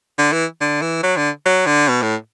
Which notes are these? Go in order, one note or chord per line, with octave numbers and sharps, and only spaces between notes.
D3
E3
D3
E3
F#3
D3
F#3
D3
B2
A2